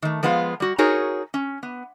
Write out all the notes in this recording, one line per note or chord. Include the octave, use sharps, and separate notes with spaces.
D#3 A3
F3 G#3 B3 F4 F5
G3 F#4
D#4 F#4 G#4 A#4 C#5
C#4
B3